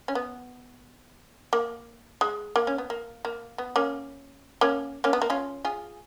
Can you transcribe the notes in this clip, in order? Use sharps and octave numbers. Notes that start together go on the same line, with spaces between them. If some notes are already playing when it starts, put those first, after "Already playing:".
C#4
B3
A#3
G#3
A#3
C#4
B3
A#3
A#3
B3
A#3 C#4
A#3 C#4
A#3 C#4
B3
A#3
C#4 F4
F4 G#4